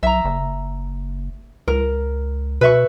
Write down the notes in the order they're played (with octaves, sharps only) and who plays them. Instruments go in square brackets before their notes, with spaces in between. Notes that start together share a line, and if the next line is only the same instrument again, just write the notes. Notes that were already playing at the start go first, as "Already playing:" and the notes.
[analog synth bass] B1 [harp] E5 A#5
[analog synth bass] F#1
[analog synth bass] C#2 [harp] A#4
[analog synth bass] B2 [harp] B4 E5 C#6